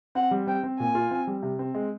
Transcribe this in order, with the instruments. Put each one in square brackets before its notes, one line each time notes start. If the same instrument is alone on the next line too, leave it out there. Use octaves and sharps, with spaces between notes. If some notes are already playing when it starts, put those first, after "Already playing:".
[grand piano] C4 [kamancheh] F#5
[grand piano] G3
[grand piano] C4 [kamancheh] G5
[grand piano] C4
[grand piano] A#2 [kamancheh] G#5
[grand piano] F4
C4
G3
C3
C4
G#3